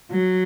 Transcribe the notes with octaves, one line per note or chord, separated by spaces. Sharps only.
F#3